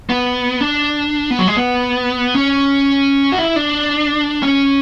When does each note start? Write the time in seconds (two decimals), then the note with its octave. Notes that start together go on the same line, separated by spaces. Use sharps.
0.10 B3
0.61 D4
1.31 B3
1.39 F#3
1.48 G#3
1.57 B3
2.35 C#4
3.32 F#4
3.38 E4
3.56 D4
4.43 C#4